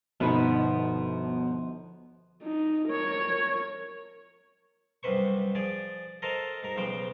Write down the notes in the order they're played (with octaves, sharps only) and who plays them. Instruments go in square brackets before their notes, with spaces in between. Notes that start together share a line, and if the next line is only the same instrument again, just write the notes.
[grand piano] G1 D#4 [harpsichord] B2 [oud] F3 B3 B4
[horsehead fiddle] D#4
A#4 C#5
[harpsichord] C2 F#2 C3 B4 C5 C#6
F3 G#4 D5
A4 A#4 C5 D#5 F5 A5
G#2 A#4
B1 C#3 F3 C5 G5